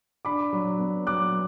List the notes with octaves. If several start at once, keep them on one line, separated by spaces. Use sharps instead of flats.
D4 B5 D6
F#3
B3
F#3 D6 F#6